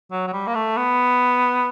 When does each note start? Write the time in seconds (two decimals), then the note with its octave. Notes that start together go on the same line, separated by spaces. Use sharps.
0.12 F#3
0.27 F#3
0.33 G3
0.47 A#3
0.55 A3
0.77 B3